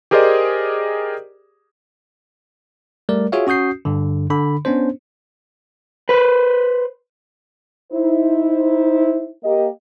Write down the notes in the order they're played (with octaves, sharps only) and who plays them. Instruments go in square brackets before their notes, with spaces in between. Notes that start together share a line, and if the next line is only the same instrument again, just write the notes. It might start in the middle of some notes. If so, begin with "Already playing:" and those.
[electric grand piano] G4 G#4 A#4 C5 D5 D#5
[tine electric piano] G3 A3 A#4 D5
F4 F#4 G#4 C#5 E5 F5
C#4 F#4 D#6 G6 C7
G2 D3
D3 B5
B3 C#4 D4 C5
[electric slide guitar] B4 C5
[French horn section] D#4 E4 C5
A#3 G4 D#5